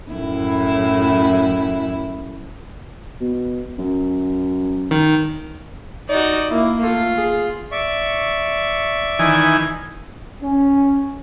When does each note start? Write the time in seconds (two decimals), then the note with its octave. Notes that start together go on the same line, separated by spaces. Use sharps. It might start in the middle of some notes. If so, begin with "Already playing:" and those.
0.12 F#2 A2 E4
3.21 B2
3.79 F#2
4.91 D#3
6.09 D#4 F#4 D5
6.50 A#3 E4
6.82 A3 F4
7.17 G#4
7.72 D5 E5 C#6
9.19 D#3 E3 G#5
10.42 C#4